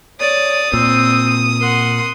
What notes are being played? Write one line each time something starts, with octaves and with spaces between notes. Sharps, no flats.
C#5 D5 D#6
A#2 C4 E6
A#4 F#5 C6